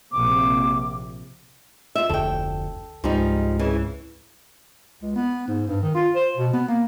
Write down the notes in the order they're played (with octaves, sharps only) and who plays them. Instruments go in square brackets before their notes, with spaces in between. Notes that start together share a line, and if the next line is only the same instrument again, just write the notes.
[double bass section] A#1 C3 [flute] D6
[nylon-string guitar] F4 E5
[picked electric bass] F1 D2 [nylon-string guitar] A4 G5
[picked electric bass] C#2 G#2 [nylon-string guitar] F3 G3 D#4
[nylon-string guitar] C#3 E3
[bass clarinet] C#2
B3
G#2
G2
D#3
F4
C5
B2
B3
A#3